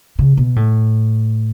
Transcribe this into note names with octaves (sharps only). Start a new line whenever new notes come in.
C#3
B2
A2